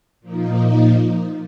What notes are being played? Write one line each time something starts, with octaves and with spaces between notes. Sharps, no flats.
A#2 F3 A#3 D#4